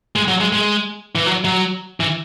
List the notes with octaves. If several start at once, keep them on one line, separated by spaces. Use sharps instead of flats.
G#3
F#3
G#3
G#3
E3
F#3
F#3
E3